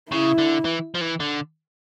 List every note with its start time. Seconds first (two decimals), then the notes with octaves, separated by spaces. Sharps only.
0.12 C#3 E4
0.38 D3
0.65 E3
0.95 F3
1.01 E3
1.20 D3